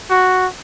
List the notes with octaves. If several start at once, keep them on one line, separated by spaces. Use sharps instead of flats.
F#4